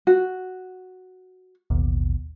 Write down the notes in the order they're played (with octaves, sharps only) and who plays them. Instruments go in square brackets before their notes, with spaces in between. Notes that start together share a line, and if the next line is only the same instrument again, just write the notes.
[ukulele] F#4
[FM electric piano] A1 D#2 B2